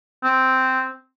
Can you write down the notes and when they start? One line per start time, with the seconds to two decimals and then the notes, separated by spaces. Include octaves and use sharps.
0.23 C4